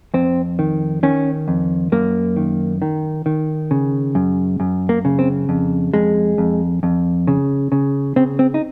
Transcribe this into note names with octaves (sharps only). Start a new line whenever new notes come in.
F2 C4
D#3
D#3 C#4
F2
F#2 A#3
D#3
D#3
D#3
C#3
F#2
F#2
A#3
C#3
C4
F2
F2 G#3
F2
F2
C#3
C#3
C#3 C4
C4
D#4